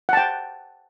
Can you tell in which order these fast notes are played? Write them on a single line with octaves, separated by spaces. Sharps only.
F#5 A5 G5